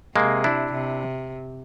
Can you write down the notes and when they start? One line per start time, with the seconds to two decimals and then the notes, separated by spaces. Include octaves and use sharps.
0.16 C3 G#3 A#3
0.44 D4 E4
0.73 C3